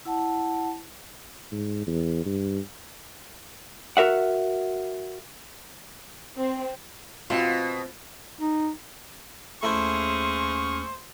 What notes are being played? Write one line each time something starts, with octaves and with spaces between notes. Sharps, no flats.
E4 F#5 A5
G#2
E2
G2
F#4 A#4 E5 F#5
C4
B2 C4 F4
D#4
D#2 A3 C#4 E4 G#4 C5 C#6 F6